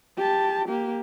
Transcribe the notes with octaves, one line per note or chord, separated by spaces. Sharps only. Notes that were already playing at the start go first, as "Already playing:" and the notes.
G4 A5
A#3 G4